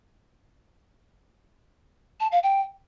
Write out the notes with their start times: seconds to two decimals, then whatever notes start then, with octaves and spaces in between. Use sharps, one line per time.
2.20 A5
2.32 F5
2.43 G5